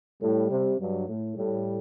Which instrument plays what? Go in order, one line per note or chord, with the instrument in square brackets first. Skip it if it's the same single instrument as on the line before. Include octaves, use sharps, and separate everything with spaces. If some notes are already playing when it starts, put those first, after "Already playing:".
[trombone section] A2 [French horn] G3
[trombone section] C3
[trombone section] G2 [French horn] F#3
[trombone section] A2
[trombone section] A2 [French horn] G3